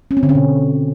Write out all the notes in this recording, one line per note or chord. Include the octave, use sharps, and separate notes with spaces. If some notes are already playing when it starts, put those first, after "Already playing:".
C#4
C4
D3
C#4
B2